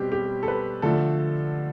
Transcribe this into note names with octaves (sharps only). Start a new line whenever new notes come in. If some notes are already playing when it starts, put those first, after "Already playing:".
Already playing: B2 G3 C4 G4
G4
A4
B4
D3 F3 A3 A4